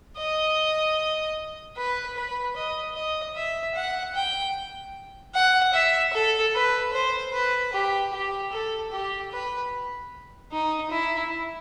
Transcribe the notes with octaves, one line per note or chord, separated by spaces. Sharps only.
D#5
B4
B4
D#5
D#5
E5
F#5
G5
F#5
E5
A4
B4
C5
B4
G4
G4
A4
G4
B4
D#4
E4